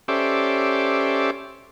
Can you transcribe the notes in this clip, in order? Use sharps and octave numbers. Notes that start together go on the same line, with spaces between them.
C#4 G4 A4 C5 D5 E5